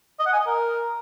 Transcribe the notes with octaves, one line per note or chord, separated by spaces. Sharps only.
D#5
F#5
G#5
D#5
A#4